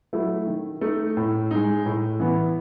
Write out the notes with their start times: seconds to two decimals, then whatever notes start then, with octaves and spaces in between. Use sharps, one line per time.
0.13 F#3 A3 E4
0.47 D#3
0.81 A3 D#4
1.17 A2
1.51 G#3 D#4
1.86 A2
2.20 E3 B3